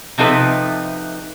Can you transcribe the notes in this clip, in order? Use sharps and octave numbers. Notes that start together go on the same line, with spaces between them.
C3 F3 D#4 A4 B4 E5